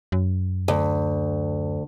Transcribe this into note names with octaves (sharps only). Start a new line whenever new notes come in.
F#2
D2